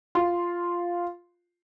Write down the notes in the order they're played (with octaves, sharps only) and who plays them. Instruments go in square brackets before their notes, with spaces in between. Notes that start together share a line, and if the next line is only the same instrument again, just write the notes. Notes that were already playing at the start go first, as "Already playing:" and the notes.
[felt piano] F4 C6